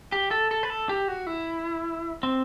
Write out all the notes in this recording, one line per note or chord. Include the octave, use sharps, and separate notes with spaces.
G4
A4
A4
B4
A4
G4
F#4
E4
C4